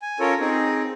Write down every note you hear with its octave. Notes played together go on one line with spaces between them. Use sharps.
G#5
C#4 F4 A4 A#4 C#5
C4 D#4 G#4